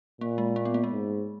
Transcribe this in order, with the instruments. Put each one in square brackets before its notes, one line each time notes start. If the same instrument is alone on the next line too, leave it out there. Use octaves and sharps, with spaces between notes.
[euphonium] A#2 [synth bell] A#3
[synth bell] G#3
A#3
B3
A#3
G#3
[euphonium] G#2